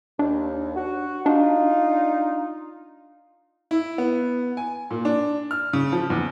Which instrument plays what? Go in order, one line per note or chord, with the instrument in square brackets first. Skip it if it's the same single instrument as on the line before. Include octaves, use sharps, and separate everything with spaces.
[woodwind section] D#2 [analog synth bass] D4
[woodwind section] F#4
[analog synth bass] D4 [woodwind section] D#4 F4
[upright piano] E4
B3
G#5
A#2
D4
F6
C#3
F3
E2